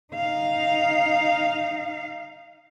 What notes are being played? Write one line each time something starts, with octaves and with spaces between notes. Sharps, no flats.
D#4 F5